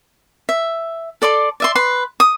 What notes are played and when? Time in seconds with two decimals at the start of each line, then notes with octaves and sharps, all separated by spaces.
0.49 E5
1.22 A4 D5 C6 D6
1.60 D5 E5 C6
1.75 B4 C6
2.20 D#6